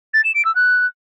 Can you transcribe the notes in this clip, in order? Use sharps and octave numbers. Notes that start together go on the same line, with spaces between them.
A6
E7
D7
E6
F#6